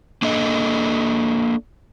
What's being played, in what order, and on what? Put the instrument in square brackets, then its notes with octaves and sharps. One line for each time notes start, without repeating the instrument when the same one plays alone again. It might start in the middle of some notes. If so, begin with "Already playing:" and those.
[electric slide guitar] A#3 D4 A4 D#5